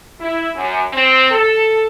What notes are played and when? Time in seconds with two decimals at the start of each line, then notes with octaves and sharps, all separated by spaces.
0.20 E4
0.55 F#2
0.93 C4
1.31 A4